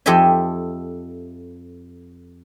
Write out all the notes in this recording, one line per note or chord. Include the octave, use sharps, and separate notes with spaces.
F2 G4 A4 D#5 E5 G#5